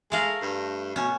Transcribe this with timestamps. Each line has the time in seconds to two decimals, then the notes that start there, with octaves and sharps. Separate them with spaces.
0.12 G#3 A3 F5 A#5
0.42 G2
0.96 B2 C#4